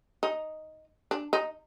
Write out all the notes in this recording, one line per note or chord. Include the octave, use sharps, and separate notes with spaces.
D#4
D4
D#4